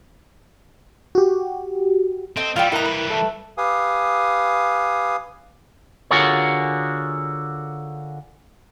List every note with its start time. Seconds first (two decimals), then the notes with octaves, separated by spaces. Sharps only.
1.15 F#4 G4
2.37 C4 A4 D#5
2.56 E3 G3 F4 D5 G5 E6
2.72 E4 A#4 D#5 A#5 F#6
2.85 B4
3.10 A4 E5 A5
3.57 G4 B4 F5 G#5 D#6
6.11 D3 F4 F#4 G#4 A#4 C#5